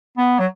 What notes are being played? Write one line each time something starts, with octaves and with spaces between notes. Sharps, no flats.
B3
F#3